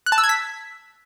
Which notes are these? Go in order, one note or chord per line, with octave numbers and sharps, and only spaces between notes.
F#6
A5
E6
G#6
B6